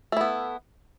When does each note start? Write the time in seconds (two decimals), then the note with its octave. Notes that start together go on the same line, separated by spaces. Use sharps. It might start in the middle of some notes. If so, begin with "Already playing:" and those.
0.12 A3
0.17 E4
0.21 B3